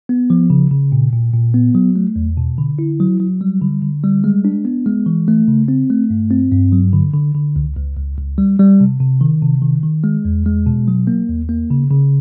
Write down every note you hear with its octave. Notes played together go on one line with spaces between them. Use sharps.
B3
F3
C#3
C#3
A#2
A#2
A#2
B3
F#3
A3
E2
B2
D3
E4
F#3
F#3
G3
D3
D3
G3
G#3
D4
B3
G#3
E3
A3
C#3
C4
A3
G2
C4
G2
F#3
D3
D3
D3
C#2
C#2
C#2
C#2
G3
G3
C3
C3
D#3
C3
D#3
D#3
G#3
E2
G#3
B2
F#3
A#3
D#2
A#3
C#3
C#3